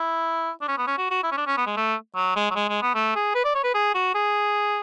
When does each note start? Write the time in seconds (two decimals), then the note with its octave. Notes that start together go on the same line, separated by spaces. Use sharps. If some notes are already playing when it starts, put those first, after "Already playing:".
Already playing: E4
0.61 D4
0.68 C#4
0.78 B3
0.87 C#4
0.98 F#4
1.11 F#4
1.23 E4
1.32 C#4
1.37 D4
1.47 C#4
1.57 B3
1.66 G#3
1.77 A3
2.16 F#3
2.36 G#3
2.51 F#3
2.55 G#3
2.69 G#3
2.82 B3
2.95 A3
3.16 G#4
3.35 B4
3.45 D5
3.55 C#5
3.64 B4
3.74 G#4
3.95 F#4
4.15 G#4